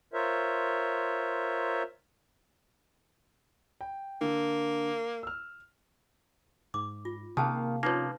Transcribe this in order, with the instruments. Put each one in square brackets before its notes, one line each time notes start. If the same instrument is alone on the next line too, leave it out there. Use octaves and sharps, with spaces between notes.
[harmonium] F4 A#4 C5 C#5 E5
[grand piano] G5
[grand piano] D3 [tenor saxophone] A#3
[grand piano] E6 F6
[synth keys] G#2 [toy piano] D6
[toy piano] F4
[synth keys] C3 F5 [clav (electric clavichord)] D#3 [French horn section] A#3 [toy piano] C#4 G#4 A5
[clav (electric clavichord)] F3 A#3 [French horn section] C#4 F4 [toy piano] D#4 B4 C#5